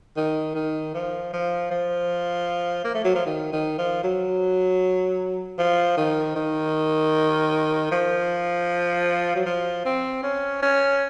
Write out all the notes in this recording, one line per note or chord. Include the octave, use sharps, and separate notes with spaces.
D#3
D#3
F3
F3
F3
A#3
A3
F#3
F3
D#3
D#3
F3
F#3
F3
D#3
D#3
F3
F#3
F3
C4
C#4
C#4